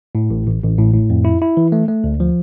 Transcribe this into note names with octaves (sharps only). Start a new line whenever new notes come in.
A2
A1
A1
A1
A2
A2
F2
E4
E4
E3
A3
A3
D2
F3